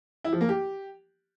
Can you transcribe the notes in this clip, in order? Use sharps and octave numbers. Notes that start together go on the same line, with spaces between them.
E4
F3
A#3
G4